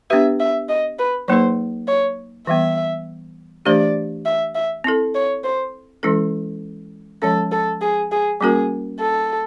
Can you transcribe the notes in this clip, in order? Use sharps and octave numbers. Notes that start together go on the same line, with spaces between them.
B3 D4 G4 B4 E5
E5
D#5
B4
F#3 A#3 D#4 G#4 B4 C5
C#5
E3 G3 B3 E5
E3 A3 D4 G4 C5 D5
E5
E5
C4 E4 A4
C#5
C5
E3 G#3 C#4 E4 A4
F3 G#3 C#4 A4
A4
G#4
G#4
G3 A#3 C#4 F#4 G#4 A#4
A4